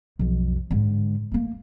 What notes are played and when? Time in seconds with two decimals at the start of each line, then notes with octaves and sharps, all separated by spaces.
0.19 B1 F2
0.71 G#2 D3
1.32 A3 A#3